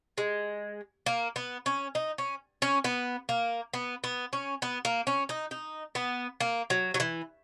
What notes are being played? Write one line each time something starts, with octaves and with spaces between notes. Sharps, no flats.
G#3
A#3
B3
C#4
D#4
C#4
C#4
B3
A#3
B3
B3
C#4
B3
A#3
C#4
D#4
D#4
B3
A#3
F#3
F#3
E3